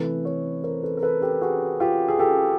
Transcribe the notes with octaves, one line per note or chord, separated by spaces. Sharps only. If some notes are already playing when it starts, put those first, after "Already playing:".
Already playing: C3 E3 A3 A4 B4
B4 C#5
A#4 C5
A4 B4
A#4
A4 B4
G4 A4
F#4 G#4
F4 G4
G#4
G4 A4